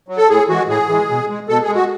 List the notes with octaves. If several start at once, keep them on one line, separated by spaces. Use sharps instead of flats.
F#3
A4
A2 G#4
E3 G#3 F#4
A2 G#4
E3 G#3
B2
G#3
B2 A4
G#4
G#3
F#4